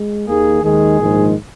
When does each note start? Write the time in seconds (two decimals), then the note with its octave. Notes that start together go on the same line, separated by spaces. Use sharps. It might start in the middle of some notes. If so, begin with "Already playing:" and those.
Already playing: G#3
0.26 D#2 D#3 A#3 G#4
0.62 D#2 D#3 G#3 G#4
0.99 A#1 G#2 D#3 G#3